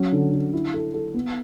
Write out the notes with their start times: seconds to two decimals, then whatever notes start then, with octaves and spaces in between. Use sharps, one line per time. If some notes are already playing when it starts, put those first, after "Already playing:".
Already playing: F#3 C#4
0.12 D3
0.32 D3
0.53 E4
0.74 A4
0.94 A4
1.14 B3